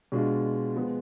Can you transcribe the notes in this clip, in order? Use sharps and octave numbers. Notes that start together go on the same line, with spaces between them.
B2 G#3 D4 F4
F3 G#3 B3